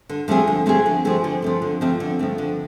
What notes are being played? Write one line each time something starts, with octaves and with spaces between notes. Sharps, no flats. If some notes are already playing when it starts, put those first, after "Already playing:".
D3
F3 A3 C4 G#4
D3
F3 A3 C4 G#4
D3
F3 A3 C4 G#4
D3
F3 A3 C4
D3
F3 A3 C4
D3
F3 A3 C4
D3